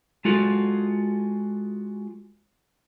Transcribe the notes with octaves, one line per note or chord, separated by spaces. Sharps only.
G#3 F4 F#4 A4